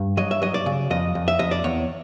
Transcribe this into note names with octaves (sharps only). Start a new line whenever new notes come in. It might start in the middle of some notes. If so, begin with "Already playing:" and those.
Already playing: G2
F#3 D#5
E5
F#3 D#5
D5
C#3
F2 D#5
F2
E5
F2 D#5
D5
E2 C#5